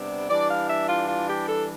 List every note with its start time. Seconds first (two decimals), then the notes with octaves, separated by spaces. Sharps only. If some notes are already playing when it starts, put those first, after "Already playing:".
Already playing: C3 G3 B3 D4
0.30 E3 G3 D4 D5
0.50 F5
0.70 E5
0.89 F4
1.09 F4
1.29 G4
1.49 A4